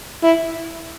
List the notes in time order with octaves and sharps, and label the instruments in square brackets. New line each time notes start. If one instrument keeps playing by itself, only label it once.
[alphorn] E4